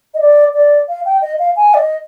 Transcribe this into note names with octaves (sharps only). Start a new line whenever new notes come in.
D#5
D5
D5
F5
G5
D#5
F5
G#5
D5
D#5